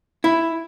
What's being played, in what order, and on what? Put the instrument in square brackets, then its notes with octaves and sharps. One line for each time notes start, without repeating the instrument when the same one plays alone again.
[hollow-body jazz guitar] E4